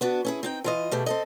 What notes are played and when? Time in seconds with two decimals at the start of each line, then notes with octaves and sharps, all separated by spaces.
0.01 B3 D4 F#4
0.25 C#4 E4 G#4
0.43 C4 D#4 G5
0.64 E3 F4 D#5
0.91 B2 A3 G4 G#4
1.06 C4 A4 D#5